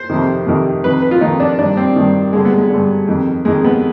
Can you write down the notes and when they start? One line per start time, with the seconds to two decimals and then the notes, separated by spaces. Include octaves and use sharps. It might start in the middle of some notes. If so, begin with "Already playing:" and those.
Already playing: C5
0.10 F2 C3 D#3
0.46 F2 C3 D#3
0.84 F2 D#3 B4
1.02 B4
1.11 F4
1.21 F2 D#3 D#4
1.40 D4
1.58 G2 D#3 D4
1.77 C4
1.96 G2 D#3
2.33 G2 D3 G#3
2.45 B3
2.58 G#3
2.70 G2 D3
3.08 F2 D#3
3.45 F2 D#3 G#3
3.65 B3